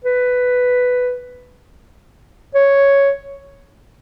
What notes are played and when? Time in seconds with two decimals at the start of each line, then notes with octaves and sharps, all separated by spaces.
0.05 B4
2.55 C#5